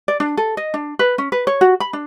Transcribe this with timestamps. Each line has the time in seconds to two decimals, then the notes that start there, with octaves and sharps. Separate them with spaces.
0.08 D5
0.20 D4
0.37 A4
0.57 D#5
0.74 D4
0.99 B4
1.18 C#4
1.32 B4
1.47 C#5
1.61 F#4
1.80 B5
1.93 D4